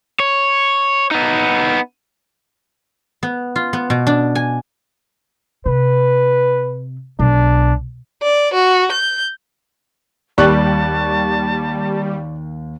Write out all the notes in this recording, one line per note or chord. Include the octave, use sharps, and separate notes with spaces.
C#5
B3 D#4
B3
F4
B3
B2
D4
G#5
C3 B4
B1 D4
D5
F#4
G6
D#2 G3 D5 A5 C#6 F#6